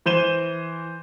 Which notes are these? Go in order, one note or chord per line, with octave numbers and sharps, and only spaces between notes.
E3 C5 D#7 E7 G7